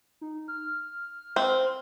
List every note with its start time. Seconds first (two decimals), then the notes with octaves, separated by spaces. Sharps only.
0.21 D#4
0.48 F6
1.36 C4